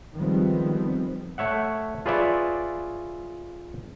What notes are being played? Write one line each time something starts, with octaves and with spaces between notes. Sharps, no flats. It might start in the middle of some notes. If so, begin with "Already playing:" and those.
D#3 F3 G3 G#3 B3 C4
A3 C#5 E5 F#5
F4 G#4 B4 C#5 D5 E5